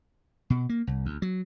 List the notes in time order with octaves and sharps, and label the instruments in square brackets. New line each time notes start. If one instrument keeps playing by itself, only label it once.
[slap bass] B2
A#3
C2
D2
F#3